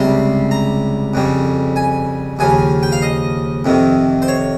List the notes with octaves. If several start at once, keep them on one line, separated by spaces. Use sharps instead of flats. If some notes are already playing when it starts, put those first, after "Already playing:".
Already playing: C#2 C3 G3 C6
A#5
F2 C#3 G3
G#5
D#2 C#3 F3 G#5
G5
F5
D#5
F2 C3 D#3
C5
C#5